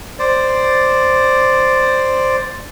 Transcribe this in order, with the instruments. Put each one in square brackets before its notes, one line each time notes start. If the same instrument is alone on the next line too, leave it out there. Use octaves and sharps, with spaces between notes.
[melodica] C5 D5